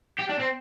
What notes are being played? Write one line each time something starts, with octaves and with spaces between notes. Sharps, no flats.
G4
D4
C4